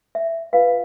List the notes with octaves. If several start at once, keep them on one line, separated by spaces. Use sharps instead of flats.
E5
F4 B4 F5